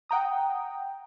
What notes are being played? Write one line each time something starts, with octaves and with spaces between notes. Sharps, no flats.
F#5 G5 A#5 D#6